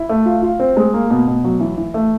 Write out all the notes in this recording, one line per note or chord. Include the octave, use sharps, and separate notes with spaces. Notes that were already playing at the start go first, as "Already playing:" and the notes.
Already playing: E4
A3
F4
F4
C4
G#3
A#3
B2
B2
F#3
E3
E3
A3